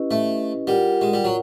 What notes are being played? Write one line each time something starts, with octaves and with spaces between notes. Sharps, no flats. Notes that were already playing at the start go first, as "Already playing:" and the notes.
Already playing: C#4 E4 G4 B4 D#5
A3
G3 F4 A#4 D5 F#5
G#3
G3
F#3